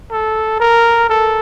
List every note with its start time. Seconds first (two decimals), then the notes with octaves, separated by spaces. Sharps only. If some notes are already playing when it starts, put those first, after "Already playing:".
0.11 A4
0.60 A#4
1.09 A4